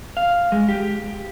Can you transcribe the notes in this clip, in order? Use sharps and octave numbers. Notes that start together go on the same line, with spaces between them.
F5
G#3
G4